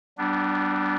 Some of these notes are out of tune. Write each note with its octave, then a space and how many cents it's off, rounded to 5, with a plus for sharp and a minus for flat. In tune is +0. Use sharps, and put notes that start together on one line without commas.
G3 -30 B3 +0 D4 +0